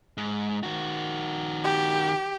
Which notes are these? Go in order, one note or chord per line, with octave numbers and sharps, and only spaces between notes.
G#2
D#3 F#4
G4